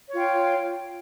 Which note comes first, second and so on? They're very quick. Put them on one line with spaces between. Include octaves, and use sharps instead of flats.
C#5 F4 G5